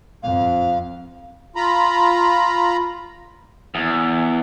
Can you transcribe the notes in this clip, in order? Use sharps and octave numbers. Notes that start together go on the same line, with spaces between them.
F2 F5
F4 A#5 B5
E2